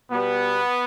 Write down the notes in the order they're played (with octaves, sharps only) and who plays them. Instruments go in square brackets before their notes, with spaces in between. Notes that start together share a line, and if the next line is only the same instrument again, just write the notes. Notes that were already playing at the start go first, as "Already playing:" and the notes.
[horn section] B2 G3 B3